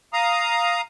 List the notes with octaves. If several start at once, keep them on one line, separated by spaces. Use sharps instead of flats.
F5 A#5 D#6